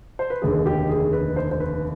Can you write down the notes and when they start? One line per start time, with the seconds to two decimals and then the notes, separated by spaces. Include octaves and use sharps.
0.19 C5
0.30 B4
0.42 F1 D#2 D3 G#4
0.66 G4
0.89 G#4
1.13 B4
1.36 C5
1.51 C5
1.60 B4